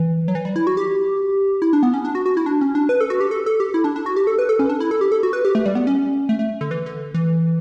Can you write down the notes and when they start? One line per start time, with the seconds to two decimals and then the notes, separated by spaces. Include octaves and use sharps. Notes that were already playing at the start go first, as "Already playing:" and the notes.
Already playing: E3
0.28 F#3
0.35 E3
0.45 G3
0.56 E4
0.67 F#4
0.77 G4
1.62 E4
1.73 D4
1.83 B3
1.94 C#4
2.05 D4
2.15 F#4
2.26 F#4
2.37 E4
2.46 D4
2.61 C#4
2.75 D4
2.89 B4
3.00 A4
3.10 F#4
3.21 G4
3.31 A4
3.46 A4
3.60 G4
3.74 E4
3.84 D4
3.96 D4
4.06 F#4
4.16 G4
4.27 A4
4.39 B4
4.49 A4
4.59 C#4
4.69 D4
4.80 E4
4.91 A4
5.01 G4
5.12 A4
5.23 F#4
5.33 B4
5.45 G4
5.55 A3
5.66 G3
5.75 B3
5.87 C#4
6.29 A3
6.39 A3
6.61 D3
6.71 E3
6.86 D3
7.14 E3